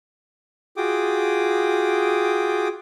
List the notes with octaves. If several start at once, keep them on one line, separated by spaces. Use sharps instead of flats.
F4 F#4 G#4 G5 D6 D#6